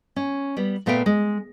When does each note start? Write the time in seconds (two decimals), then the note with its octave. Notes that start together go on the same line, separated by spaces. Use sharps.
0.16 C#4
0.57 G3 B3
0.86 A#2 A3 B3 E5 F5 G5
1.06 G#3